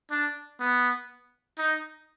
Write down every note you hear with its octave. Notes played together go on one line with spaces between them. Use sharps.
D4
B3
D#4